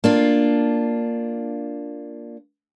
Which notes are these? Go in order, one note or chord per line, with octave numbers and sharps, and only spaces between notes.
A#3 D4 F4